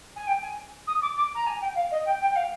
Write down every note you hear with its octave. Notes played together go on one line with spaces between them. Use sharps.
G#5
G5
G#5
D#6
D6
D6
A#5
G#5
G5
F5
D#5
G5
G5
G5
F5